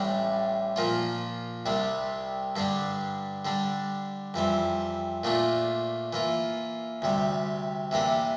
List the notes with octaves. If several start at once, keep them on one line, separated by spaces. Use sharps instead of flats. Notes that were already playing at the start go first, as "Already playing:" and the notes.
Already playing: A1 A2 G3 D4
A#2 F3 A#3 F4
C2 C3 G3 D4
G2 D3 G3 D4
D3 G3 D4
F2 E3 G3 C4
A#2 A3 D4 F4
E3 A#3 F4
D2 C3 G3
C3 E3 A#3 D4 G4